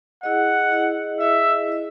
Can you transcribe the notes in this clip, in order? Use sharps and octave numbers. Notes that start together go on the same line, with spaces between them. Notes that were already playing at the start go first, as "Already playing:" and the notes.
E4 G#4 D#5 F#5
E4 G#4 D#5
E4 G#4 D#5 E5
E4 G#4 D#5